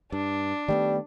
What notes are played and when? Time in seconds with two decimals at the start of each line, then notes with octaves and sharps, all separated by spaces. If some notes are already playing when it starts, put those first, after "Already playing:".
0.12 G2 D4
0.68 D#3 G3 A3 B3